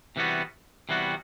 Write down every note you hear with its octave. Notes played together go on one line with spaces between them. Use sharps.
C3 E3 G3 B3 F#4
C3 E3 G3 B3 F#4